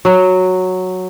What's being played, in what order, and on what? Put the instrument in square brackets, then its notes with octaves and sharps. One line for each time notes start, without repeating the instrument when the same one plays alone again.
[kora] F#3